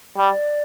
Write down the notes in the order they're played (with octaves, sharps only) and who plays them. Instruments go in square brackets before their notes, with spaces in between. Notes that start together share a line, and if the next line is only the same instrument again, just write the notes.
[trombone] G3 [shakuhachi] D5